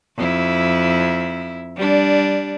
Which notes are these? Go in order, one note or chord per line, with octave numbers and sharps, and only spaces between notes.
F2 E4
G3 D4